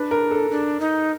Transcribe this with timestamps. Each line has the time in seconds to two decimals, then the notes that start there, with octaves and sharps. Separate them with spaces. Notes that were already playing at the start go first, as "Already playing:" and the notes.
Already playing: D4 B4
0.11 A#4
0.31 A4
0.51 D4
0.80 D#4